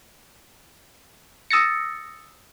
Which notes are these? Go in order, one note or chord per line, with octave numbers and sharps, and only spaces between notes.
D#6 E6 A6 A#6 C#7